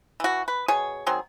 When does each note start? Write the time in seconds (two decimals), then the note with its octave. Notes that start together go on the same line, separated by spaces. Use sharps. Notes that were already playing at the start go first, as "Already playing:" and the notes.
0.20 E3 F#4
0.48 B4
0.68 B2 G#4 C#5
1.06 D#3 F#3 C4 G#4